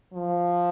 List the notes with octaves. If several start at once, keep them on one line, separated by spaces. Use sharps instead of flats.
F3